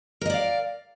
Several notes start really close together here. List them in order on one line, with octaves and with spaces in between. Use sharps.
A#4 D#5 D5 F5